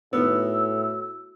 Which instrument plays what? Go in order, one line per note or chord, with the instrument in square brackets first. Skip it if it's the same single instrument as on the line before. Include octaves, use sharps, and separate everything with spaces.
[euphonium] A2 [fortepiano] D#3 B3 [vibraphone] F#4 [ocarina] E6